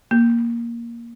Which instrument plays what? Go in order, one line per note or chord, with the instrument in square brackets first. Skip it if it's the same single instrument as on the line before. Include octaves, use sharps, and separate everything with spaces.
[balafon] A#3